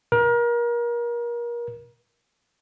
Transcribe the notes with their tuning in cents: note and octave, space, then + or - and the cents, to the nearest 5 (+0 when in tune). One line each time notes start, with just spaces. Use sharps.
A#4 +30